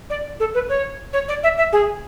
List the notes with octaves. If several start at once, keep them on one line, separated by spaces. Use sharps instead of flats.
D5
A4
B4
C#5
C#5
D5
E5
E5
G#4